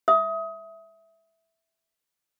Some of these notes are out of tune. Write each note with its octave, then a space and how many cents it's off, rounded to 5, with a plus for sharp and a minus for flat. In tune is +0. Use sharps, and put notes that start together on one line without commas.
E5 -5 D#6 +25